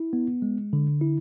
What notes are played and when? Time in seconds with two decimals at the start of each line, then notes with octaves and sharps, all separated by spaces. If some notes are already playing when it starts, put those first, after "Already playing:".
Already playing: E4
0.13 B3
0.42 G#3
0.73 D3
1.01 E4